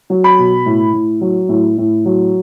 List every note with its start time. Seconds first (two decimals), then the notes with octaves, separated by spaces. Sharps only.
0.10 F#3
0.24 B5
0.39 B2
0.66 A2
0.93 A2
1.21 F#3
1.49 A2
1.78 A2
2.05 F#3